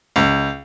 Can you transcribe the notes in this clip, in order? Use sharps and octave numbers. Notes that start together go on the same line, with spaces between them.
C#2